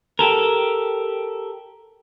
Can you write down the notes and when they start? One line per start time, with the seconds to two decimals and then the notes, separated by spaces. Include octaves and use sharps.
0.19 G4 A4 A#4